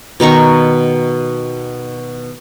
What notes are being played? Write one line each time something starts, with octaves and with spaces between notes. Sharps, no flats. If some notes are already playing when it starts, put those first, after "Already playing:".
B2 D#3 A#5 C#6